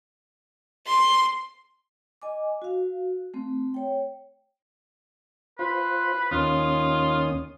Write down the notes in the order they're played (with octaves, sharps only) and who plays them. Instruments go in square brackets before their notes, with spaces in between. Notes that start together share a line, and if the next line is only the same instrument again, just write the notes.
[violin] C6
[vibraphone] D#5 G#5 D6
F#4 F5
A3 C4
C#5 G5
[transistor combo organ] F4 C5 [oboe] B4
[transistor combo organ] D#2 C#4 D#6 [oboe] F4